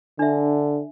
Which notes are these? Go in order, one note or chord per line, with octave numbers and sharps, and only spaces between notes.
D3 D4 E5